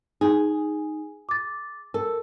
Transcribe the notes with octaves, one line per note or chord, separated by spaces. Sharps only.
D#4 G#4
D6 A6
A4 A#4